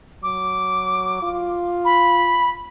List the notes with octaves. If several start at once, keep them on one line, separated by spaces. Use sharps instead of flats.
F#3 D6
F4
B5